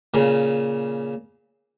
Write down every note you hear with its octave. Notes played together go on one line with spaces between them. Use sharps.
A#2 C#3